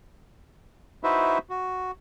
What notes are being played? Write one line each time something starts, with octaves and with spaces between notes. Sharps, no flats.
D#4 E4 F#4 B4 C5 E5
F#4